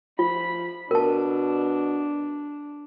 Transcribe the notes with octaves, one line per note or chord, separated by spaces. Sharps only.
F3 F4 B5
B2 D4 A#4 A5